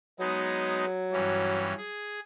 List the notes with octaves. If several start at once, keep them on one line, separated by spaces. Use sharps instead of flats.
F#3 G#3 B3 D#4
G2 E3 C#4
G#4